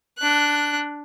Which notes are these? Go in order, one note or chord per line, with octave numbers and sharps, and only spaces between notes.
D4 F#6